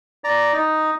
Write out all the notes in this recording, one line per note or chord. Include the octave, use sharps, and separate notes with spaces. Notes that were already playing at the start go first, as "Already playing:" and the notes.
D5 A#5
D#4